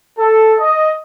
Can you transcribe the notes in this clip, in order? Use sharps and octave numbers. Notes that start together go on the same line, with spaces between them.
A4
D#5